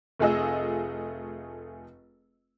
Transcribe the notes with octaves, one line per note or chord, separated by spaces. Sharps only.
F1 A3 F4 G#4 D#5 E6